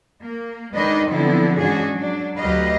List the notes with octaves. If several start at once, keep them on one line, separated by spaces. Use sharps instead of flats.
A#3
D#3 G#3 D4 D#4 B4 D#5
D3 F3 F#3 B3 C4 E4
G#2 E3 C#4 D4 F#4 G#4
F#3 D4
D2 F#3 G4 B4 D#5 F5